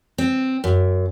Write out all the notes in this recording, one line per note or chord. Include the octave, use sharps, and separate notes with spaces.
C4
F#2